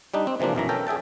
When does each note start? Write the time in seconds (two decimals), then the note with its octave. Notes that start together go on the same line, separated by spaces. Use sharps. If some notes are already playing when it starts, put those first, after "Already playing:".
0.14 G3 D4 D#4
0.27 C4
0.40 C3 E3 F3 A#3 D4
0.55 B1 F#2 E3 A#5
0.69 C#4 A4 A#4 G5
0.87 G#4 E5 G5 A5